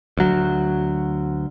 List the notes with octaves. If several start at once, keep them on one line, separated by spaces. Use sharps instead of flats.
D2 F#3